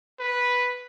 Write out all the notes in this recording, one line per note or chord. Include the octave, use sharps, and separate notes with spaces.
B4